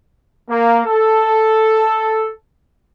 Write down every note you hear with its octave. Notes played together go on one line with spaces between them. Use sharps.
A#3
A4